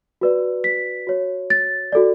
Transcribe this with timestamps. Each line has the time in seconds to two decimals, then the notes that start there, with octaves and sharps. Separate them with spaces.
0.21 F#4 B4 D5
0.64 B6
1.07 F#4 C#5
1.50 A6
1.92 F#4 A4 D5